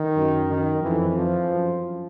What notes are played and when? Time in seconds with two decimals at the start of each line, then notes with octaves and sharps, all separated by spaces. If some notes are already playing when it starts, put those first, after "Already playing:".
Already playing: D#3
0.16 F#2
0.49 D#3
0.83 F2 E3
1.16 F3
1.49 F#2